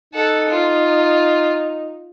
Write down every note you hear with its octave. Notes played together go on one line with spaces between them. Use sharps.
D#4 A4 F#5
F4